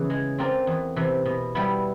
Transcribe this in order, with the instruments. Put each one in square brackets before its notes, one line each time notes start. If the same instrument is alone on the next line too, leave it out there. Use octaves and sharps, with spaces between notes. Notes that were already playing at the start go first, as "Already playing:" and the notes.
Already playing: [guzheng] E2 C#3 E3
G#3
C4 F4 A#4 D5
E2
C3 E3
B2
G3 B3 E4